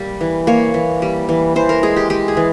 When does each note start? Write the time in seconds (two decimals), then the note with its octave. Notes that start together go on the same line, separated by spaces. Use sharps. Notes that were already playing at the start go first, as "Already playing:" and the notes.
Already playing: G3 A#3
0.21 E3
0.47 A#3 C#5
0.74 E3
1.02 G3
1.29 E3
1.56 E3 C5
1.69 A#4
1.83 G#3 G#4
1.96 G4
2.10 G#3 G4
2.28 G#4
2.37 E3